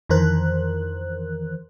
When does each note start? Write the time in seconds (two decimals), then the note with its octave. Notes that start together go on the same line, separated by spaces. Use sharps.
0.09 F2 D#3 E3 A#4 C5 F#6